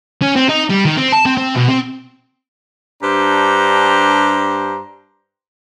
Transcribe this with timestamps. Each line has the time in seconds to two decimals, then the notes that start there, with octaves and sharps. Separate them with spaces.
0.22 C#4
0.36 C4
0.49 D#4
0.70 G3
0.85 D#3
0.97 C4
1.12 A5
1.26 C4
1.38 C4
1.55 B2
1.69 C4
3.02 G2 D4 G4 C5 A#5